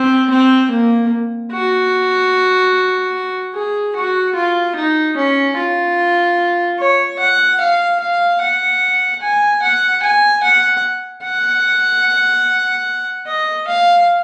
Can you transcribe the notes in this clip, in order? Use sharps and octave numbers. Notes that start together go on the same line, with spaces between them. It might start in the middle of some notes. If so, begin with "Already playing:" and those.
Already playing: C4
C4
A#3
F#4
G#4
F#4
F4
D#4
C#4
F4
C#5
F#5
F5
F5
F#5
G#5
F#5
G#5
F#5
F#5
D#5
F5